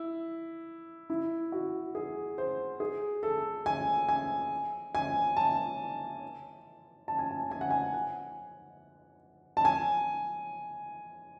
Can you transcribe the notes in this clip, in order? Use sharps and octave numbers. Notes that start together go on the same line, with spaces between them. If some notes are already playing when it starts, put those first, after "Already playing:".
Already playing: E4
E4
F#4
G#4
C5
G#4
A4
G#5
G#5
G#5
A5
A5
G#5
A5
G#5
F#5
G#5
F#5
A5
G#5